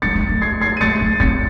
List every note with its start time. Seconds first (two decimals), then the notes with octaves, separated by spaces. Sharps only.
0.02 G#3 A6 C#7
0.15 C4
0.29 A3
0.42 G#6 C7
0.61 G#6 C7
0.77 D#7
0.81 A3 A6 C#7
1.01 A3
1.20 C4 A6 C#7